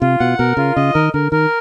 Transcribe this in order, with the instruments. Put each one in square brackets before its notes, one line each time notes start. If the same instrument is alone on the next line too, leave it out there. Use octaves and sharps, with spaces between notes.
[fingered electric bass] C3 [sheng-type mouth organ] F4
[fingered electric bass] B2 [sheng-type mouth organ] F#5
[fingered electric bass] B2 [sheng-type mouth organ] A#4
[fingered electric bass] C#3 [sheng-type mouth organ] F4
[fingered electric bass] C#3 [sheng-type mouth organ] D#5
[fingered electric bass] D#3 [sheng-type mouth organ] A#4
[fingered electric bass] D3 [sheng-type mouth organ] A#4
[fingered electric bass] D#3 [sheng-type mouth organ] A#4